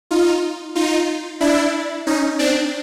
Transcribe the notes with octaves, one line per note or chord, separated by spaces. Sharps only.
D#4 F4
D#4 F4
D4 E4
C#4 D#4
C4 D4